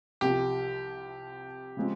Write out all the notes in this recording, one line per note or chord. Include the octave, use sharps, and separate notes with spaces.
C2 C3 F3 G4
C#3 F3 G#3 C4